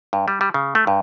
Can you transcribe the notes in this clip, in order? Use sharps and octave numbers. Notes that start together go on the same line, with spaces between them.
G2
G3
G3
C#3
A3
G2